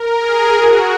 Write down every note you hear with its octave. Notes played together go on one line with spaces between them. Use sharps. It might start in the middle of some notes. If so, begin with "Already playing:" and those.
Already playing: A#4
G#4
F#4